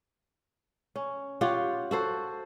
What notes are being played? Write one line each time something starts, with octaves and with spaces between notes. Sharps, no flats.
C#4
F4 G4 C#5 F#5
F#4 A4 C5